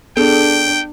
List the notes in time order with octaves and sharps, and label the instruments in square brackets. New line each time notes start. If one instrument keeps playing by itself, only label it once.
[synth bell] B3 G#4 A4 [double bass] D4 [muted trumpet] G5